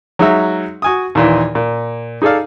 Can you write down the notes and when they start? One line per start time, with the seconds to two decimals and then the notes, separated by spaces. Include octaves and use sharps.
0.19 F#3 G#3 D#4 F#4 E5
0.82 F#4 G#5 D#6
1.15 D#2 A#2 E3
1.55 A#2
2.22 D#4 G#4 A4 D5 F5